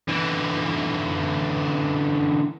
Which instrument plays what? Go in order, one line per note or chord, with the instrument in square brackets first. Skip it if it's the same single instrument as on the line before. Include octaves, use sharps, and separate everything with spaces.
[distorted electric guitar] D3 E3